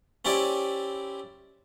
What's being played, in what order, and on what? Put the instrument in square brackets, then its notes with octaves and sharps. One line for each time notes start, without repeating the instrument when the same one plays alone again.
[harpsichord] C4 C#4 E4 G4 D5